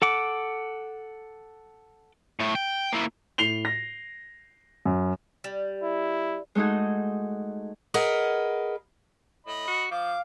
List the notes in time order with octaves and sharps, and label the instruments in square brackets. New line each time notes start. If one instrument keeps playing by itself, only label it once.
[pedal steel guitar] A4 F#5 D6
[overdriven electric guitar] A2 A3
G5
A#3 E4
[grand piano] A2 C7 F7 G7
A#6
F#2
[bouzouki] G3
[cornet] E4
[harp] G#3 A3 D#4 F#4 G#4
[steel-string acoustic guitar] G#4 A#4 B4 D#5 F#5
[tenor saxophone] A2 [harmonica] D#5 B5
[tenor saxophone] F#4
[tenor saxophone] F3 [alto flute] F5 [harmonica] D6